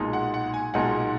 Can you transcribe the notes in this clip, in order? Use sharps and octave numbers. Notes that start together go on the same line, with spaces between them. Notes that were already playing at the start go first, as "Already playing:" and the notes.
Already playing: B1 A#2 G#3 D#4
F#5
F#5
G#5
B1 A#2 G#3 D#4 F#5